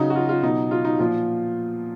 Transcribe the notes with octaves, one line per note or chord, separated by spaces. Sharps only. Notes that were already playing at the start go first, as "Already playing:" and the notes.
Already playing: C#3 F#3 D#4
F#4
F4
F4
B2 F#3 D#4
F4
D#4
A#2 F3 F4